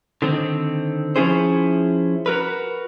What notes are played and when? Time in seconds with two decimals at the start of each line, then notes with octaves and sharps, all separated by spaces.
0.22 D3 D#3 C4
1.16 F3 C#4 E4 G#4 C5
2.26 F#4 A#4 B4